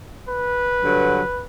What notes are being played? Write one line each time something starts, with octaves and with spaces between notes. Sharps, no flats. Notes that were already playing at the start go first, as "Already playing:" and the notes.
B4
G2 D3 F#3